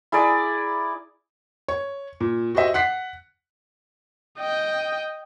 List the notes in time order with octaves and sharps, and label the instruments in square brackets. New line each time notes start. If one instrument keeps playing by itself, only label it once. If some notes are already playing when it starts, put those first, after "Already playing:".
[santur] E4 G#4 A#4 D5
[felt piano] C#5
A#2
F#4 G4 C5 D#5 E5
F#5 F#6 B6 C7
[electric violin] D#5 G5